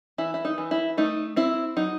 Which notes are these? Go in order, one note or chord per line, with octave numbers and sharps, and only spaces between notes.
E3 E4
E4
D#4
E3
E4
A3 D#4
C4 E4
F#3 D#4